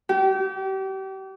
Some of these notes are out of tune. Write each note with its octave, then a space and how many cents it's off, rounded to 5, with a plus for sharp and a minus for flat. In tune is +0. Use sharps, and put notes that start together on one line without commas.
G4 -35